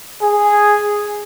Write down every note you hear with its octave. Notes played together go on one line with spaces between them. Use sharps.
G#4